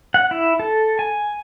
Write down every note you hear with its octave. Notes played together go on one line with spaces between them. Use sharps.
F#5
E4
A4
G#5